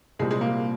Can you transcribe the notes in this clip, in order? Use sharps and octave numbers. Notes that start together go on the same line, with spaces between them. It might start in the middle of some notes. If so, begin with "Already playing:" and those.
C2 A#2 G3 G#3 C4
G#3
A#3